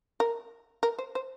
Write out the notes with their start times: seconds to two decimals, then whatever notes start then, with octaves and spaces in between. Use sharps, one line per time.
0.20 A#4
0.83 A#4
0.98 C5
1.15 C5